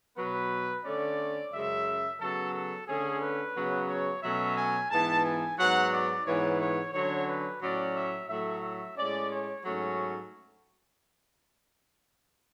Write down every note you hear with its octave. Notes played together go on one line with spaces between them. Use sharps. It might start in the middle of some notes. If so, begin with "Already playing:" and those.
B2 F#3 B3 B4
D3 A3 C#4 D5
F#2 C#3 G#3 E5
C#3 F#3 B3 A4
A4
D3 A3 C#4 G#4
B4
C#3 F#3 B3
C#5
B2 F#3 A3 C#4 E5
G#5
G#2 E3 B3 A5
G#5
G#2 F#3 B3 F#5
D5
G#2 E3 B3 C#5
C#5
D3 F#3 C#4 C#5
B4
A2 F#3 C#4 D5
E5
A2 F#3 A3 E5
E5
A2 G#3 C#4 D5
C#5
G#2 F#3 A3 C#4